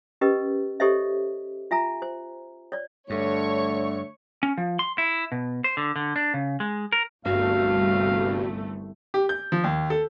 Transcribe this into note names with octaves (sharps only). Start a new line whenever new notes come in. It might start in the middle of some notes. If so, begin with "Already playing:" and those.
C#4 G4 A#4 B4 D#5
G4 A4 C5 C#5 D#5 E5
F4 E5 G#5 A#5
C5
C#5 D5
G2 D3 A3 C#5 C#6
C#4
F3
C6
E4
B2
C5
D3
D3
D4
C#3
G#3
A#4
G1 C2 G2 A3 F#4 F5
G4
G6
F3
D#2
A4